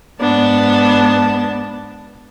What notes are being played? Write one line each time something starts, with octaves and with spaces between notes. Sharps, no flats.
G#2 B3 D4 A5